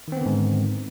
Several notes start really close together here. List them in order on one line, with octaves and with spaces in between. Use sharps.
D#3 C4 B3 D3 G#2